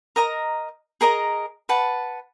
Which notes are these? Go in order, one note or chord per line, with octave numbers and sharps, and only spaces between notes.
A#4 D#5 A#5
G#4 A#4 D#5 A#5
B4 F#5 A5